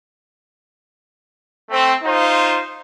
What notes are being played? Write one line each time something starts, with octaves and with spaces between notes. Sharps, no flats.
A3 C4
D#4 F4 C5